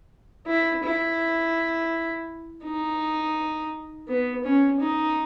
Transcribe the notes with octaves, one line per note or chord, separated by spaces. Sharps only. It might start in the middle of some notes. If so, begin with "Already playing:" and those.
E4
E4
D#4
B3
C#4
D#4